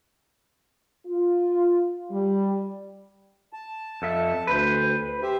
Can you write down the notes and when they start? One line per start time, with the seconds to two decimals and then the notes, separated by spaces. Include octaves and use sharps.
1.07 F4
2.11 G3
3.53 A5
4.02 F2 A4 E5
4.47 D2 B4 C5
5.22 G4 C5 E5